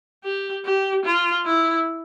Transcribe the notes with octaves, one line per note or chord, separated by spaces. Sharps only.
G4
G4
F4
E4